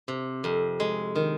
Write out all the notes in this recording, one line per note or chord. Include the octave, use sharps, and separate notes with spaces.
C3
F2
G#3
D#3